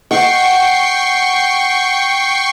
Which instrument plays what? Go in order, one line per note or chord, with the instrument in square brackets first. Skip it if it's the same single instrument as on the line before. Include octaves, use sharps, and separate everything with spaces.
[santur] F#5 [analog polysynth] G5 C#6 C7